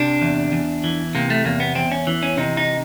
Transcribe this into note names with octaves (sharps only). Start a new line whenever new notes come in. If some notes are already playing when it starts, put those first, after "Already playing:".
Already playing: C3 D4
E2
E2
E3
C3 A#3
A3
E2 A#3
B3
E2 C4
C#4
E3
C#4
C3 D#4
D#4